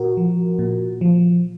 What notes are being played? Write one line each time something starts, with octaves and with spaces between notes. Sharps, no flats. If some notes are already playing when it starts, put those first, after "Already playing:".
Already playing: A#2 F#4 A#4
F3
A#2
F3